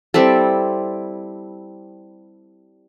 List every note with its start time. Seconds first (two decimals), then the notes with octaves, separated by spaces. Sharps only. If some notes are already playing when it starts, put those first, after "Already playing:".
0.14 G3 C4 E4 A4